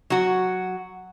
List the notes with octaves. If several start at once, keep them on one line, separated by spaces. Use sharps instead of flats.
F#3 F#4